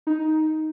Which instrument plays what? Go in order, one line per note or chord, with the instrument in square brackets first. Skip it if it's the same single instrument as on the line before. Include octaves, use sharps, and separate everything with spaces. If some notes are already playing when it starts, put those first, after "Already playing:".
[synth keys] D#4